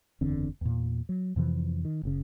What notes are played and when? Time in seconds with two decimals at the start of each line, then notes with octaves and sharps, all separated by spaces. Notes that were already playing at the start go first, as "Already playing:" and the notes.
0.21 F#1 E2 D3 C4
0.61 E2 A#2
1.09 F#3
1.36 F2 C3 E3 F3
1.85 D#3
2.03 F#1 A2 C#3